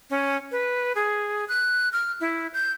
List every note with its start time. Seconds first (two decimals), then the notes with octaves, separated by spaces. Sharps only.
0.10 C#4
0.52 B4
0.95 G#4
1.48 F#6
1.93 F6
2.21 E4
2.54 G6